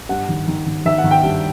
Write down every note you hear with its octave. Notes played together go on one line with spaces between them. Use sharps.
G2 F#5
D#3
D#3
D#3
D#3 E5
F#5
D#3
G5
G2